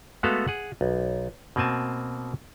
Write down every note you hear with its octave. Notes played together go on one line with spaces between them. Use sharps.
G#3 A3 B3 F#4 A4 F5
G#4 F#5
B1
B2 A#3 C4 G#5 A5